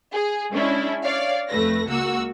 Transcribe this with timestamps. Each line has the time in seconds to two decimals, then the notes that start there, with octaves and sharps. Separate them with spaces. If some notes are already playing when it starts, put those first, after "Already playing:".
0.13 G#4
0.52 G#3 C#4 D4 E4
1.04 C#5 D5 F5
1.50 F2 A3 B4 A#6
1.87 C#2 A#3 F#4 E6